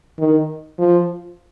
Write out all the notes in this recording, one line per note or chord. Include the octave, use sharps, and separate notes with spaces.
D#3
F3